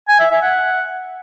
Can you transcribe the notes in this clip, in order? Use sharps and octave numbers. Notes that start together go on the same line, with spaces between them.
G#5
E5
E5
F#5